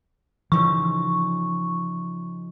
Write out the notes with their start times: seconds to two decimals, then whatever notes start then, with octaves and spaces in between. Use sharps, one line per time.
0.52 C#3 E3 F3 D#4 C#6